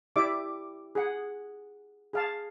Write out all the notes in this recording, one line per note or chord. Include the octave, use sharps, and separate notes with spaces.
E4 G4 D5 E5 D6
G#4 F#5
G#4 F5 A5